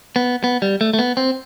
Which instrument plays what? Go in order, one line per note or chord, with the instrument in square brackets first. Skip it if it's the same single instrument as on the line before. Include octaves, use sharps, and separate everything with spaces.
[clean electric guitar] B3
B3
G3
A3
A3
B3
C4